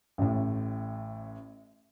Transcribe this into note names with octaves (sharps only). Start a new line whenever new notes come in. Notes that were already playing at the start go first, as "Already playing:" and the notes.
A1 A2